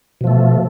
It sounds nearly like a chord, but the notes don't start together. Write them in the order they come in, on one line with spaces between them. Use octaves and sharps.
B2 F3 A3